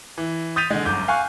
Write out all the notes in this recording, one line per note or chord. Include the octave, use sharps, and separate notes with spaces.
E3
D#6 G6 A6 B6 D#7 F7
D3 G#3
G1 F#2 D6 G6
F5 G#5 C#6 F#6